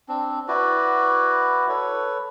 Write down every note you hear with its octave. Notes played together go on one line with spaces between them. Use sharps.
C4 D4
E4 F#4 B4 D5
A4 B4 C#5